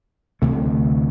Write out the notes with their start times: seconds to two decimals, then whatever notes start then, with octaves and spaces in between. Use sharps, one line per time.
0.42 D2 C3 E3 A3